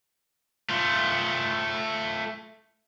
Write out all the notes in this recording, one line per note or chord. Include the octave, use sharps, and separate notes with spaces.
A3 F4